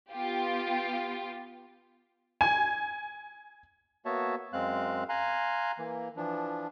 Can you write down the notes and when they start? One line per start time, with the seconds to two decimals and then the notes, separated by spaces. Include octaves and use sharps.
0.11 B3 F4 G4
2.41 G#5
4.05 A#3 B3 F#4 C#5 E5 A5
4.53 F#2 G#3 C4 F5 F#6
5.09 F5 G#5 A#5 C6 F#6
5.79 E3 A#3
6.17 E3 F3 D4